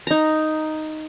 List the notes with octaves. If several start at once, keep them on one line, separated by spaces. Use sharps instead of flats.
D#4 A#5